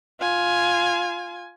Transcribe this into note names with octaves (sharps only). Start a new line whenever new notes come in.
F4 G#5